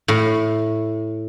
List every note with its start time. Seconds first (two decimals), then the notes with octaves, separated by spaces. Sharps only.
0.08 A2